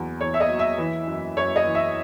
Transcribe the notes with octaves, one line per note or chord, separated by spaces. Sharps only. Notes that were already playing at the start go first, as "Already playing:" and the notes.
Already playing: E2 F#3
E2 C#5
E5
D#5
F#3
E5
E3
F#2
F#2 C#5
D#5
E3
E5